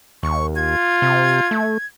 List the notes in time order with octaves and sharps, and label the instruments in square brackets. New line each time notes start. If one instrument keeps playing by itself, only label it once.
[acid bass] D#2 [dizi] C#6
[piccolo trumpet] F4 [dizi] G#6
[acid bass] C3
A3